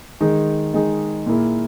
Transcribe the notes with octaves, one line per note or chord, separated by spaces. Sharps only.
D#3 G#3 D#4 G#4
D#3 G#3 D#4 G#4
A#2 A#3 E4 G#4